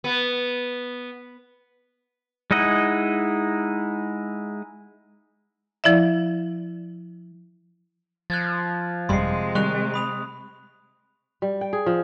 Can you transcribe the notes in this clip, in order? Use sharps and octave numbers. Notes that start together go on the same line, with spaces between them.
B3
G#3 D#4 E4 D#5 F#5
F3 E4 D5 E5
F3 F#6 G#6 A6
G1 F2 C3 G3 G#3 C6 C7
D#3 G3 C#6 F#6 F7
B5 D#6 F7
G3
G5
G#4
F3